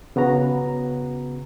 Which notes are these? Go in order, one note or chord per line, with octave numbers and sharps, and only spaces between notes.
C#3 B3 F#4 A#5